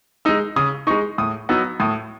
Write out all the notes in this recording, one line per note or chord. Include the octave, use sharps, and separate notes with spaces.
G#3 D#4 E6
C#3 D#6
G#3 D#4 C#6
A2 D#6
F#3 B3 D#4 E6
A2 D#6